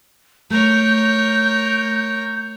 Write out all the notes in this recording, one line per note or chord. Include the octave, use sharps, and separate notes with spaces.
A3 A#4 C#5 G6